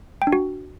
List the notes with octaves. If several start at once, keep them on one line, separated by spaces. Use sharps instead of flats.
G5
D4
F#4